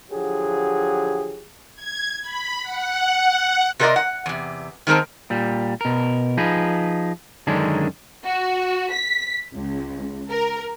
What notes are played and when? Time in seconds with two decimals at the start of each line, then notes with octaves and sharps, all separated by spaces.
0.10 D3 F3 F#3 G4 G#4
1.75 G#6
2.21 B5
2.62 F#5
3.79 C3 G4 A#4 C5 D5 D#5
3.96 F#5
4.26 E2 C3
4.87 D#3 G#3 C4 A#4 A5
5.30 A#2 G3
5.81 B2 A#4
6.37 F3 D#4 G#4 B4
7.47 F#2 D3 D#3 G#3 C#4 D4
8.24 F#4
8.92 B6
9.51 C#2
10.30 A#4